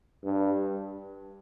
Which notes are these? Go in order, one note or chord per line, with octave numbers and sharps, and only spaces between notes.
G2